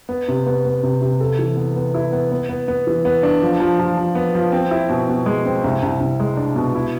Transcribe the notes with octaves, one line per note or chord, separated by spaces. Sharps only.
B3
C3
B3
B3
C3
C3
A4
E3
B3
B3
E4
B3
B3
B3
B3
E3
B3
D4
F3
F3
F3
F3
B3
F3
C4
E4
B2
B2
G#3
C4
C2
C2
C2
G#3
D4
B2
E4